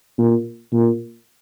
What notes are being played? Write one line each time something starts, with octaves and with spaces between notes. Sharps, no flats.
A#2
A#2